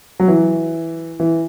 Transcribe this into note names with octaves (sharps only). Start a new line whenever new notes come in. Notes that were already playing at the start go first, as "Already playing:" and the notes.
F#3
E3
E3